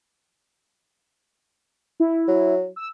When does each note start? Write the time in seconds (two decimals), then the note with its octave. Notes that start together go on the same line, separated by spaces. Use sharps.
2.00 E4
2.28 F#3
2.76 E6